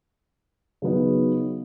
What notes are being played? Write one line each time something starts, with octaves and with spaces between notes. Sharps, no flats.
C#3 F#3 B3 D#4